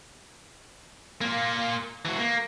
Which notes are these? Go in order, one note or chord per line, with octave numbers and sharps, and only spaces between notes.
A#3 F4
E3 F#4
A#3